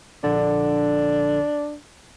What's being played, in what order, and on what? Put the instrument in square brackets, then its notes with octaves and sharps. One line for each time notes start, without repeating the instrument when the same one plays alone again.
[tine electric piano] A#1 D3 [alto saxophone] D4